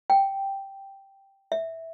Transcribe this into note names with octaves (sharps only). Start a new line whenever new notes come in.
G5
E5